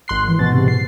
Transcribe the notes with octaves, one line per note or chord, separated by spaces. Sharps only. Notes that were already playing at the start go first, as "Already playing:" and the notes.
G#1 C6 F#6 C7
E3
G#2 B2 A6
C3
C7